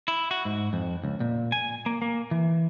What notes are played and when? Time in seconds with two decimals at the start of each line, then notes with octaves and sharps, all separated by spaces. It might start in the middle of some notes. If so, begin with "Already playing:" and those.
0.08 E4
0.31 F#4
0.45 G#2
0.73 F2
1.04 C#2
1.20 A#2
1.52 G#5
1.86 A#3
2.02 A#3
2.31 E3